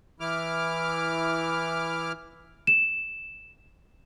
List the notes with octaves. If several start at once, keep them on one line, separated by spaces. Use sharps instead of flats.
E3 E4 D6 F6
E7